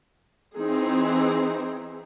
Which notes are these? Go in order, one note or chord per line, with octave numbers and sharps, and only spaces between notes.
E3 C4 D#4 G#4